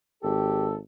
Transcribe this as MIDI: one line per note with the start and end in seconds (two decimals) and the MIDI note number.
0.23 0.80 32
0.23 0.68 67
0.23 0.76 69